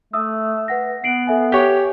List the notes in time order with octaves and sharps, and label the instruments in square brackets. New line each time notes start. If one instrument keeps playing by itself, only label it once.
[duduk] A3 [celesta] E5 D#6 E6
[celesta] B4 F#5 A#6
[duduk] B3 [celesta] C7 D7 F#7
[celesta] A4 E5 G#5
[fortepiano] G4 C#5